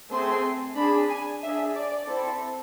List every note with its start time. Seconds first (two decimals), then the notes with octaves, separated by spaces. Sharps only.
0.11 A3 C4 G#4 C6
0.76 D4 G#4 B5
1.09 G#5
1.42 D4 G#4 E5
1.75 D5
2.07 C4 E4 A4